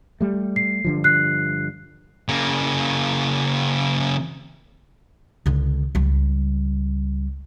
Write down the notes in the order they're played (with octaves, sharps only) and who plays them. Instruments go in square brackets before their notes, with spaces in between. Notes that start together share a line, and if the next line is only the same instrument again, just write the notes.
[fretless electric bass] G3 A3
[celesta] C7
[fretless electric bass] G2 D3 F3
[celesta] F#6 C7
[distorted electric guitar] C#3 A#3
[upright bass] C#2 D3
C#2 G3